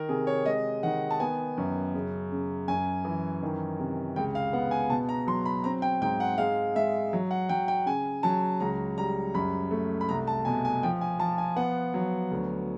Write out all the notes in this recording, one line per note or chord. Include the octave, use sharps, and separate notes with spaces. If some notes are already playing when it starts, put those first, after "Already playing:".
Already playing: D#3 A#4
C3 G#4
C#5
G#3 D#5
D#3 F#5
A5
B3 G#5
F#2
C#3
C#3
F#2 G#5
E3
D#3
C3
C#2 G5
F5
B3 F#5
G#5
B2 A5
A#5
F#3 C6
B5
C4 A#5
G5
G#2 G5
F#5
G#3 F5
G#3 E5
F#3
F#5
F#3 G5
G5
C#3 G#5
F#3 A5
C#2 A#5
G3 A#5
F#2 B5
A3
B5
C2 A#5
A5
B2 G#5
G#5
F3 G5
G#5
F3 A5
G#5
B3 F#5
F#3
D2